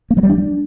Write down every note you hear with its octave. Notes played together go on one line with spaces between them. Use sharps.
A#3
F#3
G3
D4